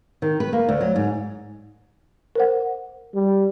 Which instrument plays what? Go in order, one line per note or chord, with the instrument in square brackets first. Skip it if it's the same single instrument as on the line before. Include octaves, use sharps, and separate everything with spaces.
[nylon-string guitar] D#3
B4
A#3
D2
F#3
G#2
[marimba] A#4 C5 F#5
[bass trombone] G3